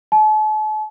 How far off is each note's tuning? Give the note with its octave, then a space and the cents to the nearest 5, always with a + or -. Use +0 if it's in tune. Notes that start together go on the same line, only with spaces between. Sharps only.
A5 -40